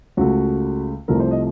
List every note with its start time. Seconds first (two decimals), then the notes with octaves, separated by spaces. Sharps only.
0.17 C#2 C#3 A3 F#4
1.08 C2 C3 F3 A3 A#4
1.20 C5
1.31 D#5